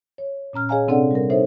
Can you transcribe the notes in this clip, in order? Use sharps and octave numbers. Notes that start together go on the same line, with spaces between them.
C#5
A#2 C#4 A#5 F6
G#4 C#5 D#5 F5 G#5 A#5
C3 C4 D4 A4 D5 F#5
G3 A#4
D#4 A4 C5 C#5 E5